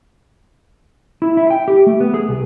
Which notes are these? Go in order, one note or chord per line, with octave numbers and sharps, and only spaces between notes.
E4
E4
G5
G4
A3
B3
G#4
C2